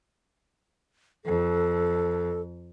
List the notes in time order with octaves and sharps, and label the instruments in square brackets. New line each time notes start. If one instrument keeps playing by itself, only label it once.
[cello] F2 [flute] A4